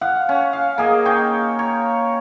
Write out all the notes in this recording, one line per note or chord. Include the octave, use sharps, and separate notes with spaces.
F5 F#5
C#4
F5
A#3 G#4 D#5
D#4 C#5 G5
C#5